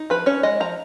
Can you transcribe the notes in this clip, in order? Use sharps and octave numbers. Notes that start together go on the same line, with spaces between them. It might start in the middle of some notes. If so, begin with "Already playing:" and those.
Already playing: D#4
F3 B4
C#4 C#5
G#3 D#5
F3 A#5